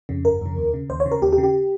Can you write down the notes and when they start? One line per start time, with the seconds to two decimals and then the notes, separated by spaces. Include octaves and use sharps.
0.09 F2 C#3
0.25 G1 A#4
0.41 F2 C#3
0.57 D#2
0.74 C#3
0.90 D#2 C5
1.00 C#5
1.06 C#3
1.11 A#4
1.22 D#2 G4
1.33 G4
1.38 C#3
1.43 G4